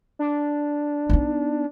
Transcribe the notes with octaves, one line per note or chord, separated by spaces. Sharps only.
D4
B3 D#4